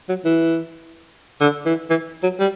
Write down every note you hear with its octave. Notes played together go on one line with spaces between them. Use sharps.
F#3
E3
D3
E3
E3
F#3
G3